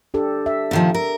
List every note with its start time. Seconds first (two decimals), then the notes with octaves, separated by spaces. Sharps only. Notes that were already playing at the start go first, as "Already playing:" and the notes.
0.14 D4 G4 A4
0.46 E5
0.71 A#2 D#3 F3
0.94 A#4